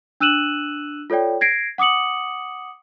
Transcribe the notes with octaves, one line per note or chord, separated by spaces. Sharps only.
D4 E6 F#6 D#7 E7 F#7
F4 A4 C#5 D5 G5
G#6 A#6 C7 D7
F#5 D6 D#6 C#7 F#7